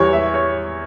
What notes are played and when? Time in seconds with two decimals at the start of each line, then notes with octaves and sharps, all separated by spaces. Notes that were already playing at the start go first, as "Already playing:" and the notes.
Already playing: E2 E3 G3 C#5
0.13 E5
0.34 C#5